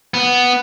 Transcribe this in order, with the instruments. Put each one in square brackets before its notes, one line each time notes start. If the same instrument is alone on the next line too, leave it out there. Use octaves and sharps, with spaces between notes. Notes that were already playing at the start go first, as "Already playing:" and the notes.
[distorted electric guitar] B3